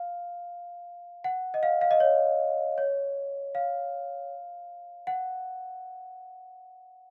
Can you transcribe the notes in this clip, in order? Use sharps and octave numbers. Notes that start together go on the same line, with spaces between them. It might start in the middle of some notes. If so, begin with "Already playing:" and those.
Already playing: F5
F#5
D#5
F5
F5
D#5
C#5
C#5
F5
F#5